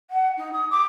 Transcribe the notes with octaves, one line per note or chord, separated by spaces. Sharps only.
F#5
D#4
D#6
D6